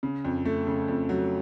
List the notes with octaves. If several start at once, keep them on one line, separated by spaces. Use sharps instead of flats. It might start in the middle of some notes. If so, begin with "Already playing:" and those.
C#3
F2
A3
C#3
F2
F#3